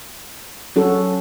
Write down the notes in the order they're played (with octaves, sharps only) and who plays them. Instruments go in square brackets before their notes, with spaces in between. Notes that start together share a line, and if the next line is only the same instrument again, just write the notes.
[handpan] F#3 C#4 F#4 A4